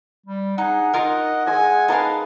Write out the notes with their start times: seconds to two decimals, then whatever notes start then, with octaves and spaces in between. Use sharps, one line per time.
0.26 G3
0.58 D#4 G#4 F#5
0.93 D#4 F4 A#4 D#5
1.46 G#3 D#5 G#5 E6
1.88 G#3 D#4 A#4 B4 F5 A5 D#6